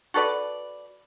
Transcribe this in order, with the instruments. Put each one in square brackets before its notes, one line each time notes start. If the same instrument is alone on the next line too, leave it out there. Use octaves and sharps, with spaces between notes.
[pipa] F#4 A4 B4 D5